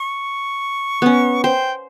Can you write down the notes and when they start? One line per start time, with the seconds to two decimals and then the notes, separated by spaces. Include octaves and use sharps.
0.01 C#6
1.02 B3 C#4
1.44 C5 G5